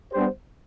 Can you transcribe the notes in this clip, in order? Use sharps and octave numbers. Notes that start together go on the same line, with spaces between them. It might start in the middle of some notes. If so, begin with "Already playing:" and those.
G3 B3 D4 G4 C5